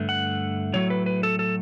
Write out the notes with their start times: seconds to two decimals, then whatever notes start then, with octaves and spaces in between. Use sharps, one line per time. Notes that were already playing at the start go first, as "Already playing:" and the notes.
Already playing: G2 D3 A3
0.09 F#5
0.73 A2 F#3 A3 C#5
0.90 B4
1.06 B4
1.23 A4
1.39 A4